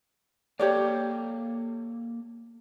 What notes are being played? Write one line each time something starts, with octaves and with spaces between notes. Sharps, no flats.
A#3 G4 A4 C#5 D5 F5